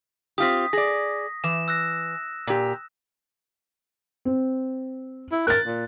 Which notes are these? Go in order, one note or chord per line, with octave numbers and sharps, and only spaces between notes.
C4 F4 G4 D#6 B6
G#4 D5 A#6
E3 E7
E6 F#6 A#6
A#2 G4
C4
E4
A#4 F#6 A6
A#2